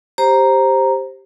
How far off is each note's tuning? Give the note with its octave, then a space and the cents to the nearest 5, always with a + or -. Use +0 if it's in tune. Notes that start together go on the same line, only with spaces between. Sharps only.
G4 +0 C5 +10 A#5 +0